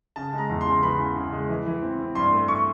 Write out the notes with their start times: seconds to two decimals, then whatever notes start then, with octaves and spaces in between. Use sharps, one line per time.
0.16 C#3 A5
0.33 G#3 A#5
0.49 E2
0.61 C6
0.66 C#3
0.83 E3 B5
0.99 C#3
1.16 C#3
1.32 G#3
1.49 E3
1.66 E3
1.82 C4
1.99 C4
2.15 G2 C6
2.32 A3
2.48 C#6